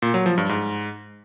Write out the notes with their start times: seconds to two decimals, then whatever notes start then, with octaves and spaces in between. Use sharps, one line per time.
0.02 A#2
0.14 F#3
0.26 F3
0.38 G2
0.49 G#2